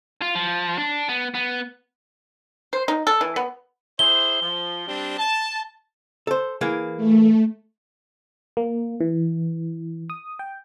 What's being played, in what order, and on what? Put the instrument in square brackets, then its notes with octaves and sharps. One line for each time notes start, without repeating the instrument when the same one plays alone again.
[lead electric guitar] F4
F3
D4
B3
B3
[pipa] C5
D#4
A4
E3
B3
[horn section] E4 G#4 C5 [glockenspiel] G7
[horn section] F3
G3 C4 D4
A5
[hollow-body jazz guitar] A4 C5
E3 A#3 G#4
[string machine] A3
[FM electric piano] A#3
E3
D#6
G5